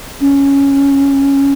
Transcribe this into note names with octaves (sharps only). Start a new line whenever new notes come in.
C#4